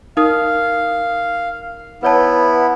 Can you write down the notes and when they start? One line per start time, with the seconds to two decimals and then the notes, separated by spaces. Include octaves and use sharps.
0.17 D#4 A#4 F5 D#6
2.03 B3 E4 B4 C#5 A5